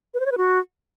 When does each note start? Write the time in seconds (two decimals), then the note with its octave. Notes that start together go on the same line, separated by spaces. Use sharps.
0.14 B4
0.20 C5
0.26 C#5
0.32 B4
0.38 F#4